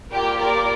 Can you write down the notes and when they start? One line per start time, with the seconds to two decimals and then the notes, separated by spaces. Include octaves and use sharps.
0.11 G3 A#3 F4 G4 A#4
0.39 G3 A#3 F4 A#4 D5